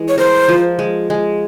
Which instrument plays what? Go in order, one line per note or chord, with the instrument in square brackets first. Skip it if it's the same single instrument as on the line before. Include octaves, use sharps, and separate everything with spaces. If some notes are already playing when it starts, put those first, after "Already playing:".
Already playing: [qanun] E3 G#3
[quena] C#5
[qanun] A#4 [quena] C5
[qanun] F3
G#3
G#3